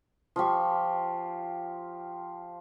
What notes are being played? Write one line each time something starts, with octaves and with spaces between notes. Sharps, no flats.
F3 F4 G4 C#6